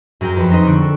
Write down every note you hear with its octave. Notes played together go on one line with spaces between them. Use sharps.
F#2 G#4 A#4 G5
F2 B4
C4 C#4 D#4 B4 C5 D#5
D3 C#6 F#6 D7
A4